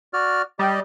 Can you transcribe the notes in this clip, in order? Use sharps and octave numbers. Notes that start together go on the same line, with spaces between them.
F#4 D5 F6
G3 G4 D5 D#5